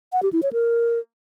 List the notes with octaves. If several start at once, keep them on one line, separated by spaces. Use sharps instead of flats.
F#5
G4
E4
C#5
A#4